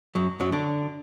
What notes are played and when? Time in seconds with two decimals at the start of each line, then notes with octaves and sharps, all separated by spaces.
0.15 F#2 F#3
0.40 F#2 F#3
0.52 D3 D4